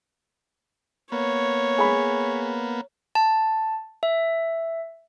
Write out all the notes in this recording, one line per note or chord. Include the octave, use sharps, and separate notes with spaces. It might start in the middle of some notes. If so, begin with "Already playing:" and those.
A#3 B3 C#5
G#4 B5
A5
E5